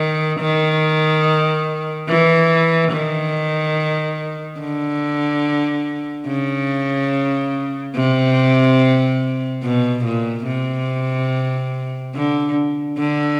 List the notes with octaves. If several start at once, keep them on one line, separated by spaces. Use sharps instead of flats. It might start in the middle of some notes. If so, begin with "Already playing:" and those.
Already playing: D#3
D#3
E3
D#3
D3
C#3
C3
B2
A#2
C3
D3
D3